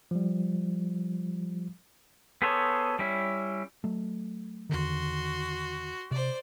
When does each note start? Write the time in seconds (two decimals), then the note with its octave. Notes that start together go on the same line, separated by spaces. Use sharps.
0.11 F3 G3
2.42 B3 G#4 A4 C5 C#5
2.99 G3 C#4 E4
3.84 F#3 A3
4.70 E2 D3 D#3 F#4 C6
6.11 C3 C5 D5